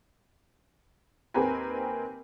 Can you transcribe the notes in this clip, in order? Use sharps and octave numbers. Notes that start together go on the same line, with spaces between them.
D#2 C4 G4 A#4 B4 G#5